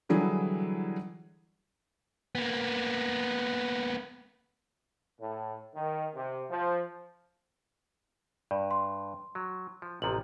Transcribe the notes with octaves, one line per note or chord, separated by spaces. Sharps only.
D3 E3 F#3 G3 E4 G#4
A#3 B3
A2
D#3
C3
F3
G2 D5
C6
F#3
F3
A1 C3 F3 G4 A#5 F#7